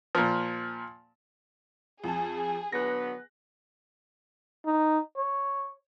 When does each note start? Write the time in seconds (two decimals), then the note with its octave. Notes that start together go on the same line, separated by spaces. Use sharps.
0.15 A#2 F3
2.04 F2 G#4 A5
2.72 D3 F#3 B3 F#6 A#6
4.66 D#4
5.17 C#5